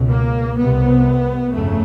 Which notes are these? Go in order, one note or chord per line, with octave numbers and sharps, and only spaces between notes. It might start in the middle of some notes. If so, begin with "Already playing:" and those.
Already playing: C#2 B2
A#3
C2 C3 B3
G1 F2 C#3 A3